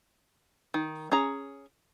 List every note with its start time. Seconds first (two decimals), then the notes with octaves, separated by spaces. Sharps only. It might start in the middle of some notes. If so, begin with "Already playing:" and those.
0.74 D#3
1.12 C#4 G#4 A#5